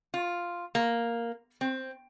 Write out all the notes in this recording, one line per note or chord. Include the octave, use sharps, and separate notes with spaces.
F4
A#3
C4